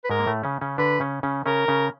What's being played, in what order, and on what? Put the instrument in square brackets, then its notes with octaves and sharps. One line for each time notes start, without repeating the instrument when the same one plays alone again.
[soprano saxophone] B4
[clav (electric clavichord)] G#2 G#3 [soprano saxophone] A#4
[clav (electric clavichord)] A#3
A2 A3
C#3 C#4
C#3 C#4
[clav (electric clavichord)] D3 D4 [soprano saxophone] B4
[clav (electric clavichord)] C#3 C#4
C#3 C#4
[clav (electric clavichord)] C#3 C#4 [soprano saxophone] A#4
[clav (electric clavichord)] C#3 C#4